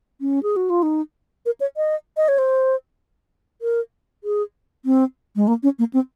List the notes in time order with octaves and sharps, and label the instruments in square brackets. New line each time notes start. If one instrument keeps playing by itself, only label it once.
[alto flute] C#4
G#4
F#4
F4
D#4
A#4
C#5
D#5
D#5
C#5
C5
A#4
G#4
C4
G#3
A#3
C#4
A#3
C4